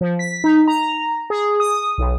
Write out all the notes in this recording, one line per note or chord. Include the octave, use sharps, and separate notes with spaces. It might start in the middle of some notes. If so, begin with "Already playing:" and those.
F3
B6
D#4
A#5
G#4
D#6
B1